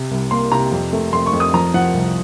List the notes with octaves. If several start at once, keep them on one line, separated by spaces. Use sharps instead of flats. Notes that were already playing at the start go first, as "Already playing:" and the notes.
Already playing: C3
C2
A#3 C6
C3 A#5
F2
A3
F2 C6
C#6
F2
D#6
F3 A#5
F3 F#5
C2